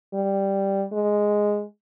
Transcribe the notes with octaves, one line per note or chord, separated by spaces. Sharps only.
G3
G#3